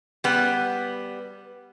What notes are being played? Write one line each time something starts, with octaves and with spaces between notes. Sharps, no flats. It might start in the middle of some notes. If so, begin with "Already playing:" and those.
G3 B3